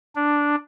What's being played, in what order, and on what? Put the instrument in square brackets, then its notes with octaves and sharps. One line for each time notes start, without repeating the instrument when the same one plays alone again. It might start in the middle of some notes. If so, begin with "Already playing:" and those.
[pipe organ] D4